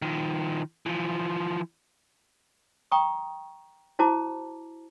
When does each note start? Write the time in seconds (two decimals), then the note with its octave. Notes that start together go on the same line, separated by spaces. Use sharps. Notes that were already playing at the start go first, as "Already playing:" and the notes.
0.02 D#3 F3
0.86 E3 F3
2.91 G5 A#5 C#6 D#6
3.99 E4 F#4 C5 A5 A#5 D6